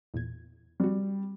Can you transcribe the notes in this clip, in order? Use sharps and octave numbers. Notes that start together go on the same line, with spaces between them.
E2 A#2 G#6
G3 C4 F#4